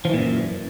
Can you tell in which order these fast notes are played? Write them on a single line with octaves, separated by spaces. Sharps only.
F3 E3 A#2 F#2